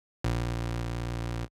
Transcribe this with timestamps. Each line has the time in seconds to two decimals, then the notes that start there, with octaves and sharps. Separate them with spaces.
0.24 A#1